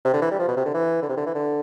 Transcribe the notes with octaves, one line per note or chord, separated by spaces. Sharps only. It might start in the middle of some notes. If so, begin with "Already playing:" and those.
C3
D3
E3
G3
F3
B2
C3
D3
E3
D3
C3
D3
E3
D3